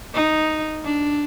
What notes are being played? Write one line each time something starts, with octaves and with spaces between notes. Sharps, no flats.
D#4
D4